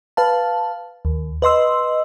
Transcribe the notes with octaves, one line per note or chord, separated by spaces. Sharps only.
B4 F5 A5
D#2
B4 D#5 C6 E6